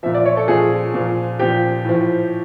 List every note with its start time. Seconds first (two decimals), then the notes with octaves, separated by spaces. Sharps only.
0.03 A#2 F3 E5
0.14 D5
0.25 C#5
0.37 A4
0.48 A#2 F3 G#4
0.94 A#2 F3
1.39 A#2 F3 G4
1.85 A2 F3